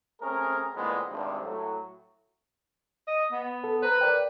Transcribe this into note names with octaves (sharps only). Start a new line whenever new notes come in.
A3 C4 C#4 G#4 A#4
D2 A#2 E3 G#3 B3 C4
G#1 G2 C3
A2 F#3 A3
D#5
B3
A4
B4 C5 A#5
A#4 D5 G5